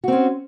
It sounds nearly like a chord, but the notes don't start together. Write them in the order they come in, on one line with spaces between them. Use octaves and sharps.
F#4 C4 C#4